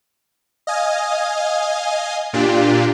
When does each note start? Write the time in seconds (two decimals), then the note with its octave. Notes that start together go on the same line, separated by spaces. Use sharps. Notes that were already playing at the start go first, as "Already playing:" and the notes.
0.67 D#5 F5 G#5
2.33 A#2 D4 F4 G4